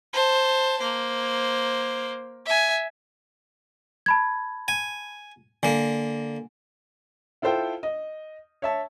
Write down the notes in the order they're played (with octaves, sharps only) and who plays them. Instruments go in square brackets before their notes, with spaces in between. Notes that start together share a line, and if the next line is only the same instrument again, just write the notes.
[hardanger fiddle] C5 A5
A#3 C5
E5 G#5
[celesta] A5 B5 G#6
[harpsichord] G#5
[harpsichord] D3 A#3 [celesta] G#5
[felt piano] E4 F4 A4 C5 G5
D#5
C#5 E5 A5